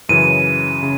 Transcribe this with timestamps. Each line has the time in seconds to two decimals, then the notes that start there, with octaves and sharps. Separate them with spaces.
0.09 F#2 C#3 E3 D#7
0.83 C#3